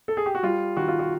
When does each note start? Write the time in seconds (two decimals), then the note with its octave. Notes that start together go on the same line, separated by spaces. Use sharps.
0.08 A4
0.17 G#4
0.26 G4
0.35 F#4
0.43 G3 F4
0.77 D#3 F#4
0.88 F4
0.99 F#4